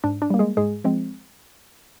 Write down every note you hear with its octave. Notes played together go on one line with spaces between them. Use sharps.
G#2 D4 D5
D4 D5
G3 A#3
G#3 G#4
G#2 G#3 G#4
F3 G#3 C4